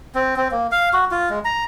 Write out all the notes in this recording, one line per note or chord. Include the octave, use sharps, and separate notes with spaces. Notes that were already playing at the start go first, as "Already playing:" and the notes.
C4
C4
A#3
F5
F#4
F4
G#3
A#5